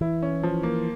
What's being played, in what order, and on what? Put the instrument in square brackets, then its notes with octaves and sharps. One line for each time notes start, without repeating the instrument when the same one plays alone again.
[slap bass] E3 [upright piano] E4
[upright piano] C#4
F3
A#3